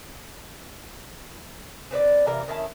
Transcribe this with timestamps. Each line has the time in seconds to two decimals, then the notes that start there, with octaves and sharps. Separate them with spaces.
1.91 C4 B4 C#5 D5
2.27 C3 E3 A#3 A#4
2.48 D#3 C#4 E4 A5